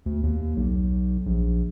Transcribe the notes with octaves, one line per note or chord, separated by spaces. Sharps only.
D2
D#2
B1
A#1